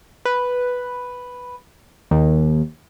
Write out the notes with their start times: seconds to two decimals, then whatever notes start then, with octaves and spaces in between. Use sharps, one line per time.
0.25 B4
2.11 D#2